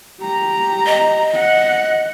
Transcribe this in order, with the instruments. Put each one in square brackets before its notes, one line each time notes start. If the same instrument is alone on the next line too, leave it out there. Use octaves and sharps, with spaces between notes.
[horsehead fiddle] G4 A#5
[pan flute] D#5
[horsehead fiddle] F#5